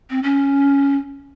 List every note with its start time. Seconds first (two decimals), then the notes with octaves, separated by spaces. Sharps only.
0.10 C4
0.23 C#4